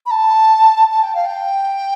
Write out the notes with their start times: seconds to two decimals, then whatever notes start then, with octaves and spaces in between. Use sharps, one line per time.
0.06 B5
0.11 A5
0.91 A5
1.03 G5
1.15 F5
1.26 G5